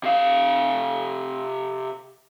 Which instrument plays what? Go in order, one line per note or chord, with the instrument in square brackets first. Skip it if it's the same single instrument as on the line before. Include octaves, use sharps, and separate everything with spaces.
[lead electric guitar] C3 F5